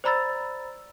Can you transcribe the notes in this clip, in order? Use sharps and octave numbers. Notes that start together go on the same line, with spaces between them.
C5 D5 A#5 B5 E6 A6